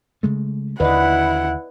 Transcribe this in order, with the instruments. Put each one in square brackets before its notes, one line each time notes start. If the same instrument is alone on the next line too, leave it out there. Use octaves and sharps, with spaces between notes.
[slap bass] C#3 G#3 A3
[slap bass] D#2 D3 D#3 [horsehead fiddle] E4 F#5 [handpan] B4 D5 D#5